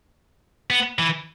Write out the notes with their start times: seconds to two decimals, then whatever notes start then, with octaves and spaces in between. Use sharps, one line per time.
0.70 B3
0.99 E3